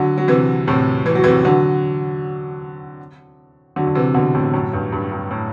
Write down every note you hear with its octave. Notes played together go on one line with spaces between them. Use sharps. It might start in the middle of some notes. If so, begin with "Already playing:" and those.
Already playing: D3 F#3
F#3
C3 E3
A2 C3
E3
F#3
C3 E3
D3 F#3
D3 F#3
D3
C3 E3
B2 D3
A2 C3
F#2 A2
G2
G2
G2
A2